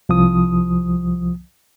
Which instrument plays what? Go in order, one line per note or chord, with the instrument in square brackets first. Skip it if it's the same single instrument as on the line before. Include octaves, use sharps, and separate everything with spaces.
[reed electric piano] C2 F3 D#6